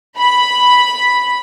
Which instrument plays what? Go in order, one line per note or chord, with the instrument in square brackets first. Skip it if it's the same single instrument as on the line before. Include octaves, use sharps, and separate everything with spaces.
[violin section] B5